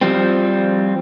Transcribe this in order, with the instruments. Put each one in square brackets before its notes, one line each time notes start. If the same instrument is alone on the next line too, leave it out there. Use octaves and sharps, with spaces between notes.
[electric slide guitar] F3 G3 C4